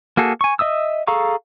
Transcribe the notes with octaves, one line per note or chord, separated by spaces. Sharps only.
A#3 F#4 G#4 A4
G#5 C#6
D#5 E5 D#6 E6
G#4 A4 F5 A#5 C#6